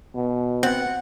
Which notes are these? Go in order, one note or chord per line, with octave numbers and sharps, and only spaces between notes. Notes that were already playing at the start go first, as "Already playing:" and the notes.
B2
B3 C4 F#5